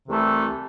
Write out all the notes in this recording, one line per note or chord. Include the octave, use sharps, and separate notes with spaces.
C2 C3 E3 A3